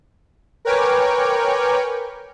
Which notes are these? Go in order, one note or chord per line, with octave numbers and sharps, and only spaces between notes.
A#4 B4 C#5 G5 G#5 D6